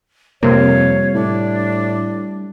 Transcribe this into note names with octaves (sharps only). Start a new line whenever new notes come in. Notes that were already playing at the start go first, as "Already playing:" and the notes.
F2 C3 G3 A#3 C#5 F5
A2 D4